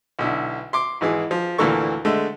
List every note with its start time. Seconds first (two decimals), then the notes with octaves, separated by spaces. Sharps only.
0.19 B1 D3 E4
0.73 C6 D6
1.01 G#1 E3 G#4
1.31 F3
1.58 D2 A#2 E3 A#3 A4 C#6
2.05 D3 G#3 A3